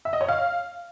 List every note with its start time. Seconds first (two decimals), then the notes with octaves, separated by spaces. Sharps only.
0.05 E5
0.13 D#5
0.21 C#5
0.29 F5